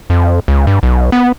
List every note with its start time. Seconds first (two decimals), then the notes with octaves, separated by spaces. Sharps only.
0.10 F2
0.48 C#2
0.67 G2
0.83 B1
1.12 B3